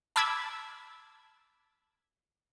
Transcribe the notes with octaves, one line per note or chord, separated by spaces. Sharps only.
A5 B5 D6 E6 G#6 B6